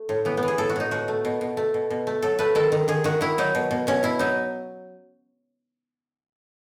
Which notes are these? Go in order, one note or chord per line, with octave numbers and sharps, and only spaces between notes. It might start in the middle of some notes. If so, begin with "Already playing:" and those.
Already playing: A3
A2
E3 B3
B3
E3
G#4
A2 A4
F#4
A2 D#4
B2 F#4
A3
B2
B2
A3
B2
B2
A3
F#3 A4
A3 B4
D#3 A4
D#3
D#3 G#4
D#3 F#4
D#3 E4
F#3 D#4
B2
B2
B2 C#4
B2 E4
F#3 D#4